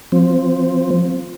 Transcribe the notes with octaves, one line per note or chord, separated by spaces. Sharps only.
F3 C4